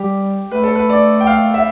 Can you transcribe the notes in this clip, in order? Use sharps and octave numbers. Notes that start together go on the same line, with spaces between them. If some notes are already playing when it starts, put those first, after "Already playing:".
Already playing: G3 G4
A3 B4
A4
B4
D5
G5
F5
E5